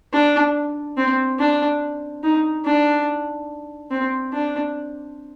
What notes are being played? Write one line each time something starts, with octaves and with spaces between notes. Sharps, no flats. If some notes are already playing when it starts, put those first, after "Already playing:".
D4
C4
D4
D#4
D4
C4
D4